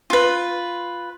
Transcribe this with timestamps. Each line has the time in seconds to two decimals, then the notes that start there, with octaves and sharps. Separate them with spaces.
0.10 F4 B4